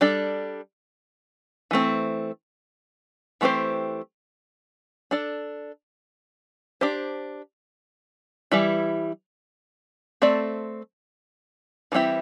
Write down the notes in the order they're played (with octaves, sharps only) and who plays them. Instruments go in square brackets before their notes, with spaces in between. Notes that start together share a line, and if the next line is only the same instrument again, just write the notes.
[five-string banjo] G3 D4 A4
E3 A3 C4
E3 A3 C4 G4 C5
D4 A4 D5
D4 G4 C5
E3 G3 E4
A3 C4 A4 D5
E3 G3 C4 E4 G4